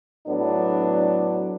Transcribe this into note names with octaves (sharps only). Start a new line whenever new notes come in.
A2 F#3 B3 D4